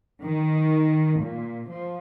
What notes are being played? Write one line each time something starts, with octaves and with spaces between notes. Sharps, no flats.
D#3
A#2
F3